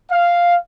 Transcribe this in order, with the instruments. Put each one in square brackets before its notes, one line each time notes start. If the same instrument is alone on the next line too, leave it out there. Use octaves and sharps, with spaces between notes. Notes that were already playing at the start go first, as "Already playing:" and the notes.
[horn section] F5